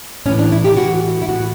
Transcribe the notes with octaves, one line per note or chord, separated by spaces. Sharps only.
A2 E3 C#4
D4
E4
G4
A2 E3 F#4
E4
A2 E3 F#4